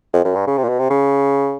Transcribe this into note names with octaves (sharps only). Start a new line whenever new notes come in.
F2
F#2
G2
C#3
C3
A#2
B2
C3
C#3